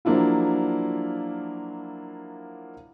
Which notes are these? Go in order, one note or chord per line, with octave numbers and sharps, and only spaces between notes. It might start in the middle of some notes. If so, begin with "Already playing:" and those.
F3 F#3 A#3 D4 E4 F4